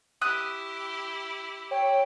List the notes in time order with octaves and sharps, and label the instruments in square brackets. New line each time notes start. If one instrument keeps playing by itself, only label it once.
[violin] E4 G4 [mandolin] D#6 F#6
[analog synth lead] C#5 [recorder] G5